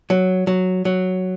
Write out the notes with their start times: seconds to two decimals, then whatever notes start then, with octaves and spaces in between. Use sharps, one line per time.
0.10 F#3
0.47 F#3
0.85 F#3